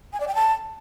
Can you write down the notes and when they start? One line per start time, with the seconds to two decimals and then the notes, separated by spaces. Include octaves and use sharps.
0.13 G#5
0.20 D5
0.28 G5
0.35 A5